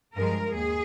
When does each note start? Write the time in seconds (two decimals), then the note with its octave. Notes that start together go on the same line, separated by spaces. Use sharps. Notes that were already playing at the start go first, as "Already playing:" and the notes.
0.16 G2 F3 G#3 A#4
0.54 D#2 G#4